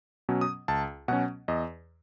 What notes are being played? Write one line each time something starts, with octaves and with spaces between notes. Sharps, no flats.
B2 F#3 C#4
D#6
C#2 A5
B2 F#3 C#4 F#5
E2 D#5